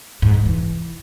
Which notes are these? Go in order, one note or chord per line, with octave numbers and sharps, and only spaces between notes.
G#2
C3
E3